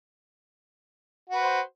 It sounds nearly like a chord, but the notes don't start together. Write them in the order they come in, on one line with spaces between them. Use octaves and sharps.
F#4 B4 C5